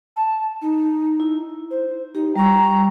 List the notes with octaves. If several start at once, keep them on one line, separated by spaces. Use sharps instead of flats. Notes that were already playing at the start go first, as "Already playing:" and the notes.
A5
D#4
E4
C5
D#4 G4
G3 A#5 C#6